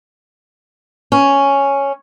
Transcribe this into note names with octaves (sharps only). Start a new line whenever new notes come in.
C#4